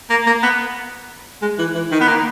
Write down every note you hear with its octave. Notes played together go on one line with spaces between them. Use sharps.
A#3
A#3
B3
G#3
E3
E3
D#3
B3
A#3